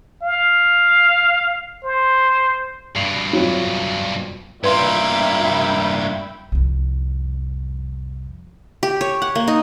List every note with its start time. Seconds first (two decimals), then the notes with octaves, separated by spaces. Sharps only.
0.23 F5
1.84 C5
2.95 G2 B2 C7 F7 F#7
3.33 F2 F#3
4.64 G2 A#3 B4 E5 G5 B5 C6
6.52 C2 F2
8.83 G4
9.01 C#5
9.22 F#5
9.35 A#3
9.48 D#4